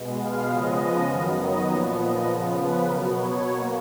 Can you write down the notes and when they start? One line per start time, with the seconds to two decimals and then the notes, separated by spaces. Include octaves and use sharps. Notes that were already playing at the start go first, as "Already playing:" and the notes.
Already playing: B2 G#3 B3
0.20 F5
0.50 C#3 F3 G#3 B3 D#5
1.09 F#2 D#3 F#3 B3 F5
1.38 D#5
1.67 A#2 F3 B3 C#5
1.98 D#5
2.27 C#3 F3 B3
2.57 B4
2.86 B2 F#3 B3 A#4
3.15 C#5
3.45 B2 A#3 C#5